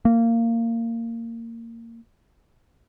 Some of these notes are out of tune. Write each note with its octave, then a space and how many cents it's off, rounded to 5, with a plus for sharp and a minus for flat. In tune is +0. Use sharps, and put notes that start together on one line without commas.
A#3 -20